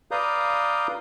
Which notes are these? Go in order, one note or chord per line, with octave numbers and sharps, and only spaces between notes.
B4 D5 F5 A#5 D#6 G6